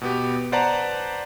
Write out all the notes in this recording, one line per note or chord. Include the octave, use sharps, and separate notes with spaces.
B2 B3 G4
B4 C5 D5 F#5 A5 A#5